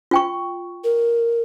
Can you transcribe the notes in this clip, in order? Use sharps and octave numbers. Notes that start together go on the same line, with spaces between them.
F4 G5 C#6
A#4